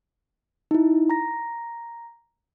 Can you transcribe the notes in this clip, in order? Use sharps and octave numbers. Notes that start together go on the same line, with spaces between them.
D#4 E4
A#5 A#6